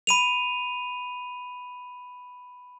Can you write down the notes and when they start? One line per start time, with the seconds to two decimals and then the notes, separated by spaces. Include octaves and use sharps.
0.07 B5 D#7 F7